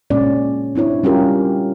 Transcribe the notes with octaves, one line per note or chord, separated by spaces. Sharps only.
A#2 G#3 C#4 D5
C4 D4 E4 C#5
G3 C#4 F4 G4 A#4